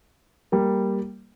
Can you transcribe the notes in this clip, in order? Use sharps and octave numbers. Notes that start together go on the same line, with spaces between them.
G3 A#3